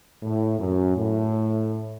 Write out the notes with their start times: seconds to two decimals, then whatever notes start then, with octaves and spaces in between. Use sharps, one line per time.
0.22 A2
0.59 F#2
0.97 A2